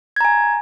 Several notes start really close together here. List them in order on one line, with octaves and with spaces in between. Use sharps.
G#6 A#5 G#5